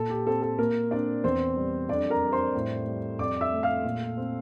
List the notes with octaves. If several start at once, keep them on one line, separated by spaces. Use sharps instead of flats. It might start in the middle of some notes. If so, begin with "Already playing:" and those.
Already playing: A#2 A4
G4
C4 A4
A4
A#2 A#3 A#4
C4 D4 D5
E2 C4 C5
G3
F2 D4 D5
A#4 A#5
G3
C5 C6
A2
G3
F2 D5 D6
E5 E6
A3
F5 F6
A#2
C4